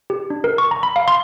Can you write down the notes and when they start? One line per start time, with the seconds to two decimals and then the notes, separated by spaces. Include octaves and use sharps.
0.10 G4
0.30 D4
0.44 A#4
0.58 C#6
0.71 A#5
0.83 B5
0.96 F5
1.08 C6